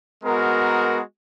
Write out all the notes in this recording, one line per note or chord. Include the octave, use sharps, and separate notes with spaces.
G#3 B3 F#4 A#4